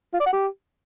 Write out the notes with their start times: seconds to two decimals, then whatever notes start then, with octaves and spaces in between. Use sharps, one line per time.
0.13 F4
0.20 D5
0.26 F#5
0.32 G4